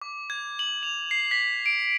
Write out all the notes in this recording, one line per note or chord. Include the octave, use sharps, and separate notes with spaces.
D6
G#6
F#7
F7
C7
B6
D7